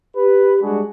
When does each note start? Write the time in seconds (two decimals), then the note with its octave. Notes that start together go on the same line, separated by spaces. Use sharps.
0.16 G4 B4
0.61 G3 G#3 D4 F#4 G#4